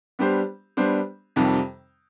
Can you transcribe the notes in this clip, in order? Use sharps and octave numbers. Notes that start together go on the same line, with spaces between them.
G3 B3 D4 G4 C5
G3 B3 D4 G4 C5
F2 C3 D#3 G3